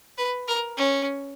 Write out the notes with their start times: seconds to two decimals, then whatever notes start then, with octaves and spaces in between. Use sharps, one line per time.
0.18 B4
0.48 A#4
0.77 C#4